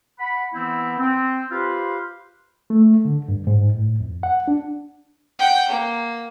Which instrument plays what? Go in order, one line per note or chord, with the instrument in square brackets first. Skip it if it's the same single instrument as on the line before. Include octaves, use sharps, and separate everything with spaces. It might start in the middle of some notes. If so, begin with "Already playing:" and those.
[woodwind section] F#5 B5
E3 B3 C4 E4
C4
F4 G4 B4 C5 F5
[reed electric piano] A3
D3
G2
G#2
A2
F2
F#5
D4
[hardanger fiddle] F#5 G5
A#3